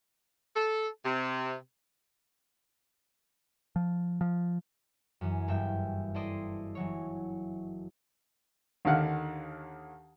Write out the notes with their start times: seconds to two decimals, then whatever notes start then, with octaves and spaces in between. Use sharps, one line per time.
0.56 A4
1.05 C3
3.76 F3
4.21 F3
5.21 F#2 E3
5.48 F#1 G2 E5 G5
6.15 E4 A4 C5 D5 D#5
6.75 E3 F#3 C#5
8.85 D#2 D3 D#3 F5 F#5